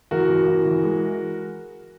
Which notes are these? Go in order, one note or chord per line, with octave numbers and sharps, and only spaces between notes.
E3 F#4 A#4
E3
E3
E3
G#3